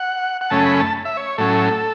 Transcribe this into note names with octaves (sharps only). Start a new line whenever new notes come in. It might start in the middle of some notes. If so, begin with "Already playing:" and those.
Already playing: F#5
F#5
F#2 C#3 A3 C#4 A5
B5
A5
E5
C#5
A2 F#3 C#4 A4